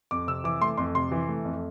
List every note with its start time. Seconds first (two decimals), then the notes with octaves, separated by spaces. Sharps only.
0.11 F2 D6
0.27 C3 E6
0.44 E3 D6
0.61 A3 C6
0.77 F2 C6
0.95 C3 C6
1.12 E3
1.29 A3
1.45 F2